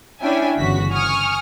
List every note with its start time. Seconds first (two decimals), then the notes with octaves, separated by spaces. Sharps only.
0.21 C#4 D4 E4 E5 G5 G#5
0.58 G1 C#3 E3 F#4 B6
0.91 G#5 C#6 D#6 F6